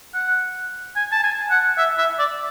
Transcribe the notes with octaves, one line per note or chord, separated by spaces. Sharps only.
F#5
G#5
A5
G#5
F#5
E5
E5
D5